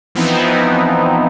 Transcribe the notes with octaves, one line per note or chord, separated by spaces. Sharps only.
E3 F3 B3 C4 D#4 E4